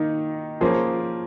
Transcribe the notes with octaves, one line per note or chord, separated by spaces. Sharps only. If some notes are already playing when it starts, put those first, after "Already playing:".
Already playing: D#3 A#3 D#4
F3 A#3 C#4 G#4 C5